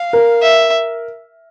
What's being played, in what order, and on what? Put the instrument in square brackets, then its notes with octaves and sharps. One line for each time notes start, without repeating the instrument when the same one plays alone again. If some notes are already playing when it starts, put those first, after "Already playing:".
Already playing: [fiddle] F5
[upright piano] A#4
[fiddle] E5